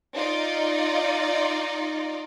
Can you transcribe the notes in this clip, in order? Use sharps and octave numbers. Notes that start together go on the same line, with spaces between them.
D#4 F4 D5 D#5